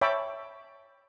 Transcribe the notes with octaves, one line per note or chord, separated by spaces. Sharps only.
C#5 E5 G5 A5 B5 D6